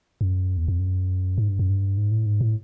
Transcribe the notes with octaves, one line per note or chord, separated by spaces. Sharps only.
F#2
E2
F2
F#2
G#2
G2
F#2
G2
G#2
A2
G#2
A2